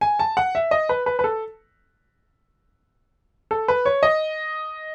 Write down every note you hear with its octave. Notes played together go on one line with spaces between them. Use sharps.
G#5
A5
F#5
E5
D#5
B4
B4
B4
A4
A4
B4
C#5
D#5